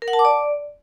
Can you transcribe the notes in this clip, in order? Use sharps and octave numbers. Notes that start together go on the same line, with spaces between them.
A#4
F#5
A5
D6
D5